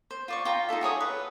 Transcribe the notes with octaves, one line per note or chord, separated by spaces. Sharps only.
C5
F4 D5 C#6
F4 G5 A#5
D#4 E4 A4 E5
F#4 G#4 C#5 D#6
B4